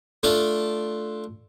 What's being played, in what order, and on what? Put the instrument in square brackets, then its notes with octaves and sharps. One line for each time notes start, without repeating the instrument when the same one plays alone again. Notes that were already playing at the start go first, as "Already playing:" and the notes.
[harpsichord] A3 D4 F4 D5